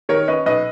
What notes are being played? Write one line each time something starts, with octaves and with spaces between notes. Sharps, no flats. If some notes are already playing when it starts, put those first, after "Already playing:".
D#3 A#4 C#5
C#4 B4 D#5
B1 B4 D#5